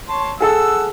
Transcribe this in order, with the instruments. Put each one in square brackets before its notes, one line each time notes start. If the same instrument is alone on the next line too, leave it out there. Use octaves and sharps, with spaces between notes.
[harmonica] C#5 A5 C6
[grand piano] G#4 A4 A5 [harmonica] F#5 E6